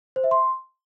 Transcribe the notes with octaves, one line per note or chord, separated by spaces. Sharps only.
C5
E5
C6